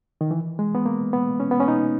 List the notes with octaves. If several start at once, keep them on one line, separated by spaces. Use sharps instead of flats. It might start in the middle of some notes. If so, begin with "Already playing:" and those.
D#3
E3
G#3
B3
A#3
B3
C#4
B3
C#4
D#4